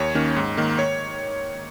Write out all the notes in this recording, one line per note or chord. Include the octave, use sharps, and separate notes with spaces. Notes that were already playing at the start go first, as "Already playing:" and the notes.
Already playing: D#2 C#5
D#3 A#3 C#4
G#2
D#3 A#3
C#5